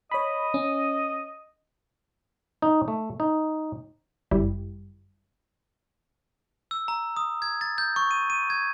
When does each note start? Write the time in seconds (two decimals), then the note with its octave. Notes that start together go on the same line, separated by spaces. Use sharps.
0.11 C#5 D#5 B5
0.54 C#4
2.62 D#4
2.88 A3
3.20 D#4
4.31 G1 F#2 G3 E4 G4
6.71 E6
6.88 A#5
7.17 D#6
7.42 G#6
7.61 A6
7.78 G6
7.96 C#6
8.11 D#7
8.30 D#7
8.50 G#6